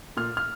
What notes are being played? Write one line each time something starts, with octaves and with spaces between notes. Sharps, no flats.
A#2 F6
F6